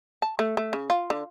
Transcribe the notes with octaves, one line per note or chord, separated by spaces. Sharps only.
A5
A3
A3
C#3
F4
D3